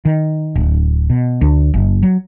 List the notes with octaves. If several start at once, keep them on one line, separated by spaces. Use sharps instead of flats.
D#3
D1
B2
D2
F#1
F#3